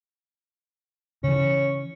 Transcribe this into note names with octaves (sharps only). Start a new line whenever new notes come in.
C#3 E3 C#4